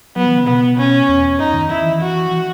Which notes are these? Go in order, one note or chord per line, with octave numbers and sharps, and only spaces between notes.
F#3 B3
E3
C#3
B2 B3
C#4
E2
F#2 D#4
D#3
D#3 E4
E3
F#4
E3